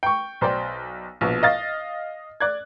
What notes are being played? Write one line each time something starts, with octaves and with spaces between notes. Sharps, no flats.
G5 C#6
B1 C5 D5 G5
A#1 B2
D#5 F5 A6
D5 F#6 G#6